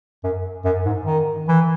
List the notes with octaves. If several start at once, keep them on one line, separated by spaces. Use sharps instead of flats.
F#2
F#2
G#2
D#3
E3